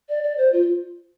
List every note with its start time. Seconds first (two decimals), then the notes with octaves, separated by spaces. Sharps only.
0.09 D5
0.23 D5
0.37 C5
0.52 F4